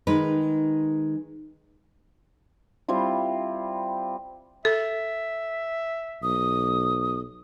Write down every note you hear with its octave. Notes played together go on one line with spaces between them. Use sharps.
D#3 G#3 D#4 B4
G3 C4 E4 F4
A4 E5
B1 D#6